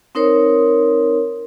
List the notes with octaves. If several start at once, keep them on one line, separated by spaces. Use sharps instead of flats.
C4 D#4 A#4 C5 C#5